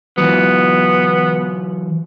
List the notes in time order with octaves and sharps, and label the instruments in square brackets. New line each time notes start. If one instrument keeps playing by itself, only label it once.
[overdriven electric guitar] E3 F#3 [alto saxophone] B3